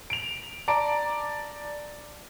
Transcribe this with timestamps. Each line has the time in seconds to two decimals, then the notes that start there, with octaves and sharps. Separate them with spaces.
0.10 D7 F7
0.68 D5 A5 A#5 D7